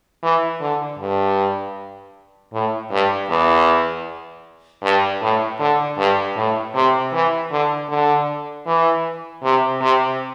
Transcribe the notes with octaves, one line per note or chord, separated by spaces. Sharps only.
E3
D3
G2
A2
G2
E2
G2
A2
D3
G2
A2
C3
E3
D3
D3
E3
C3
C3